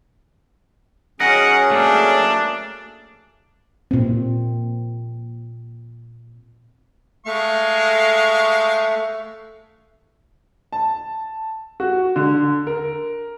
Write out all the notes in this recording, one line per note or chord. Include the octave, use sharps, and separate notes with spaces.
F#3 C#4 G#4 A#4 D#5 F#5
A3 A#3 D4
A#2 C4
G#3 A3 F5 C#6
A5
F#4
D3
A#4